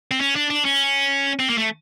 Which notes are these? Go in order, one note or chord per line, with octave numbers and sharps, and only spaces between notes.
C4
C#4
D4
D4
C#4
C4
A#3
A3